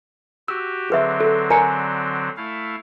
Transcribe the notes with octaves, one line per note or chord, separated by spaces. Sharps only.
F#4 G4 E6
D3 F#3 C4 G#4 B4 E5
A4
A#4 D5 G#5 A#5 C#7
A3 E4 F5